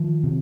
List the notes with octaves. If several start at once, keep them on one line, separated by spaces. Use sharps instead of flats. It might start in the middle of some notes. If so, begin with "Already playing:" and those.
Already playing: D#3 F3
C3